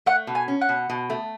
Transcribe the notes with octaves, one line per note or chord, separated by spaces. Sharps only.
A3 F#5
B2
G#5
C#4
F#5
B2
B2
A3